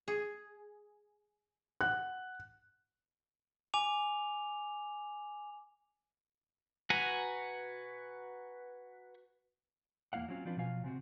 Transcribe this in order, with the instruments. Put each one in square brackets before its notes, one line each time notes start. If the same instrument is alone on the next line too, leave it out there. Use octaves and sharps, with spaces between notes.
[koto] G#4
[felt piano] F#5 F#6
[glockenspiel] G#5 D6 F7
[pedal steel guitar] F#4 B4 F#5 G#5 A#5
[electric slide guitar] E2 A#3 E4 F5 F#5
F#3 C4 C#4 F4
F3 C4 D4 F4 B4
B2 F3 F#3 F4 F5 G#5
C3 C4 F#4